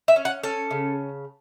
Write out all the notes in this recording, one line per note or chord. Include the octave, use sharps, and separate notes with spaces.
E5
C#4
F#5
C#4 A4
C#3